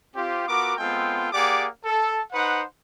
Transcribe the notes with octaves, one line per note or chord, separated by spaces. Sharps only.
C4 F4 G4
B3 F4 F#4 A#4 D6
G#3 B3 C4 F4 A4 G5
A#3 G4 G#4 D5 F#5 D6
A4
D#4 B4 C5 F#5